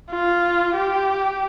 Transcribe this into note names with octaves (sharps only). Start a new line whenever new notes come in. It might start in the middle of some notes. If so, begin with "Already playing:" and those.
F4
G4